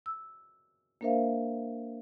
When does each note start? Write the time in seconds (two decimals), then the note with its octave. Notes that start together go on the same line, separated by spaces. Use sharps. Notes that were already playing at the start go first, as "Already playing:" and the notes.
0.06 E6
1.01 A#3 D4 A#4 C5 E5 F5